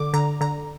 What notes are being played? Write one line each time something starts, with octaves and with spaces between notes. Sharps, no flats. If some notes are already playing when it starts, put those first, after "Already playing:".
Already playing: D3 D6
D3 A#5
D3 A#5